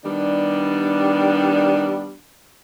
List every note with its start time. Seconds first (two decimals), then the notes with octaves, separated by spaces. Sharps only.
0.04 D#3 G3 B3 D4